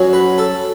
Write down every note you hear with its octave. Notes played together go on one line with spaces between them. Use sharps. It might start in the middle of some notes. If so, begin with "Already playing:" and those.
Already playing: F#2 F#3
B4
A4